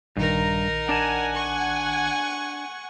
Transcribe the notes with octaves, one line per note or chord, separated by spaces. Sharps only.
A#1 G2 D#3 D#4 A#4
D4 D5 F#5 G#5 A5
C#6